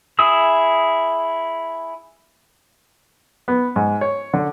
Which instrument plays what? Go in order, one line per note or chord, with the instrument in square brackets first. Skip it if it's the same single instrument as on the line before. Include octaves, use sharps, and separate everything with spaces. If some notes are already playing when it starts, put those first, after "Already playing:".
[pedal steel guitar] E4 G#4 D#6 E6
[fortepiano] B3
G#2
C#5
D3